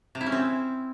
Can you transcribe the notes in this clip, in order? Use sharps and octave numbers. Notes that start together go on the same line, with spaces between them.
C3
E4
C#4
C4